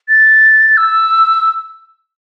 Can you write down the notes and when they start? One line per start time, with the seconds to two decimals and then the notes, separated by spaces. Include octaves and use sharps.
0.09 A6
0.77 E6